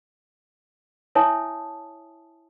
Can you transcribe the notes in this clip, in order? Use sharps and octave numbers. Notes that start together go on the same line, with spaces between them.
E4 C#5 E5 G#5 A5 D#6